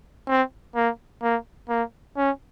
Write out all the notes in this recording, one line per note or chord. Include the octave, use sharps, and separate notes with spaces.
C4
A#3
A#3
A#3
C#4